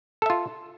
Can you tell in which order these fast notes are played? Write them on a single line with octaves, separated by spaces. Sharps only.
A4 E5 F4